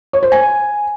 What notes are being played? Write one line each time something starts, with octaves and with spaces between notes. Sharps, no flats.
C#5
C5
G#5